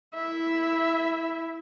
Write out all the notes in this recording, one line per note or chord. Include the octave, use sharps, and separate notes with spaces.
E4 E5